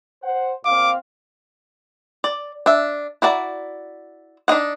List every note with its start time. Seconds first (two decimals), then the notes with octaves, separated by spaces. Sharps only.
0.23 C5 F#5
0.65 A#2 C4 F5 D6
2.24 D5
2.66 D4 E5
3.22 E4 F#4 D5 A#5
4.48 D4 D#4 D#5 F#5